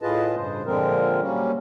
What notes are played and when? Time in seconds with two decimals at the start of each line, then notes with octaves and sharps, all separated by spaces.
0.02 A2 F4 G#4 B4 D#5 A5
0.36 G2 C#3 C5
0.66 A#2 D3 F3 G#3 C4 A#4
1.21 F#3 G3 A#3 C#4